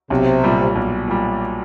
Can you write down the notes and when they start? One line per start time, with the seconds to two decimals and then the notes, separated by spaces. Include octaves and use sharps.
0.10 B1 C3
0.44 A#2 G3
0.75 B1
1.08 A#2 G3